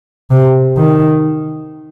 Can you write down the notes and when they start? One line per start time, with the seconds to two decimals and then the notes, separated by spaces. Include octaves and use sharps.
0.31 C3
0.77 D#3